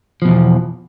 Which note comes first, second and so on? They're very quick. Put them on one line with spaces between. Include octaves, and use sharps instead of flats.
F3 B2 E2